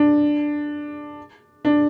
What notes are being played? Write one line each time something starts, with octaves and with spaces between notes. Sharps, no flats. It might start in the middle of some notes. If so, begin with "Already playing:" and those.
Already playing: D4
D4